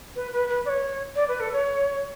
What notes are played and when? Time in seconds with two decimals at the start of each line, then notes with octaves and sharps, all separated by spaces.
0.16 B4
0.32 B4
0.49 B4
0.65 D5
0.69 C#5
1.16 D5
1.28 B4
1.40 A4
1.53 C#5